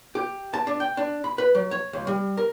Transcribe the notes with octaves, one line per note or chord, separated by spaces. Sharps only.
G4
A5
D4
G5
D4
B5
B4
F#3
C#5
C#2
G3
A#4